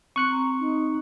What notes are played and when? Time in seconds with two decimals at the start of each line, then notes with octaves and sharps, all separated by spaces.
0.16 C4 C#6 F#6 C#7
0.30 A#5
0.60 D#4